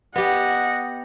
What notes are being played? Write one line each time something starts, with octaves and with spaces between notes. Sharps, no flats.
B3 G4 D#5 F#5